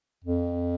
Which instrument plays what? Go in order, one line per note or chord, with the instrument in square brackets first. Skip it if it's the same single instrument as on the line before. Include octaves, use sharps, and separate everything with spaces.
[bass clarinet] F2